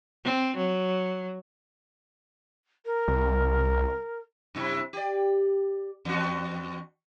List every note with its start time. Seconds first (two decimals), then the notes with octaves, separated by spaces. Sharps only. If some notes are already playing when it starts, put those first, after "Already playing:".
0.24 C4
0.57 F#3
2.85 A#4
3.08 C2
4.55 F#2 C3 E4
4.93 G4 D5
6.05 E2 F#4